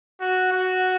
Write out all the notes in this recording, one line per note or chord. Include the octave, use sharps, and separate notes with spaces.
F#4
F#4